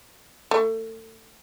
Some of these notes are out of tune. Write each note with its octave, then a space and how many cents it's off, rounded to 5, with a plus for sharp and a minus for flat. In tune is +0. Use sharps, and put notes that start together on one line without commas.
A3 +30